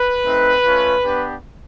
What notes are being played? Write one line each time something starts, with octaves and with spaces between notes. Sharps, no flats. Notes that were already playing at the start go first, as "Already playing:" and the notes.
Already playing: B4
A3 C4 D#4
A3 C#4 F4
B3 D4 G4